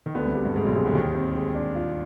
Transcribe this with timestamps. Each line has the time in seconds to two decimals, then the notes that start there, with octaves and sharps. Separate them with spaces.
0.06 D#3
0.15 D2 D3 B3
0.25 C2 C3
0.35 G3
0.45 G2
0.55 G#2 G#3
0.65 B1 B2
0.75 C2 C3 G#3
0.85 D2 D3
0.95 D#2 D#3 G4
1.15 C4
1.35 G#3
1.55 D4
1.75 F4